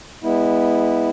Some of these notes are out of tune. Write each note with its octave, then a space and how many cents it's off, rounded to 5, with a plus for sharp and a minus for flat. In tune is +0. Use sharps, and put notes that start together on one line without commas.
G#3 -35 B3 +0 E4 -15